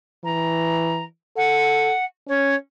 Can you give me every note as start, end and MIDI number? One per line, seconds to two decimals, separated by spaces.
0.24 1.04 52
0.24 1.04 82
1.36 1.93 69
1.36 2.04 78
2.28 2.55 61
2.28 2.55 73